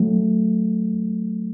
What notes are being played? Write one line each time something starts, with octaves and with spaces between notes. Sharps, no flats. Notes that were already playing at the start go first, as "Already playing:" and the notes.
Already playing: F#3 A3